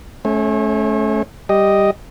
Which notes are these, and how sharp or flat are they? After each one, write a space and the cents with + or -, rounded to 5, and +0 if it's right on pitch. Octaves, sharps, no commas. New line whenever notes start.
A3 -30 C#4 +0 C#5 -40
G3 +0 G4 +0 D#5 +0